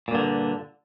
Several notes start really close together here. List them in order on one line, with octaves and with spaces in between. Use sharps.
A#2 G2 D3